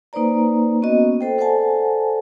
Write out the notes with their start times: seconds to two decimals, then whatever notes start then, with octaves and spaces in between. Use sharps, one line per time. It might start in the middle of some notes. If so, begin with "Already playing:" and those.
0.13 A#3 D#4 B4 C5 D5 A#5
0.82 A#3 B3 C#4 F#4 D#5
1.21 A4 C5 G5
1.38 A4 C5 D5 F#5 G#5 A5